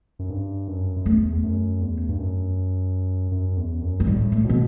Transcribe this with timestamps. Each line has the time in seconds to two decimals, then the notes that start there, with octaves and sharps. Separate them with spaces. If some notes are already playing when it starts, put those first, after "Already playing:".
0.19 F#2
0.30 G2
0.68 F#2
0.96 F#2
1.06 E2 A3
1.33 E2
1.44 F#2
1.81 E2
2.09 G2
2.18 F#2
3.32 F#2
3.57 E2
3.82 F#2
4.00 A3
4.07 A2 G3
4.32 A3
4.45 B2 B3